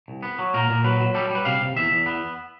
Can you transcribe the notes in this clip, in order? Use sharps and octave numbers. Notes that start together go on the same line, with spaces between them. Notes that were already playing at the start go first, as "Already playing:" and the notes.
C2
B3
F#3
A#2 A#4
A#2
F#3 B4
F#3
G3 A4
G3
B4
C3 F5
C3
E2 E5
E2
B3